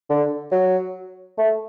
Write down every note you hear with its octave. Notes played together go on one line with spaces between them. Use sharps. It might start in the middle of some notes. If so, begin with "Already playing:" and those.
D3
F#3
A3